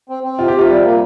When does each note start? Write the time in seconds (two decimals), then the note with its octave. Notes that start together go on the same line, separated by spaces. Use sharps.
0.09 C4
0.23 C4
0.39 C3 F4
0.48 G4
0.54 C3 F4
0.70 G3
0.84 A#3